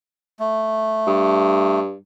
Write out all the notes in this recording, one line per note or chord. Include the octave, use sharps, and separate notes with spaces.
A3
G2